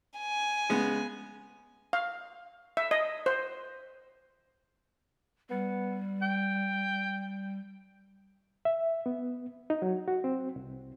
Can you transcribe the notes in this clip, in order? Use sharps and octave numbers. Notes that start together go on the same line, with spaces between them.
G#5
C#3 G#3 B3
F5
E5
D#5
C5
G3 B3
G5
E5
B3
D#4
F#3
F#4
C4
C2